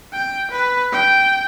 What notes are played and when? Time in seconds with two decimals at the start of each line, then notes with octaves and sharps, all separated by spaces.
0.13 G5
0.51 B4
0.92 G5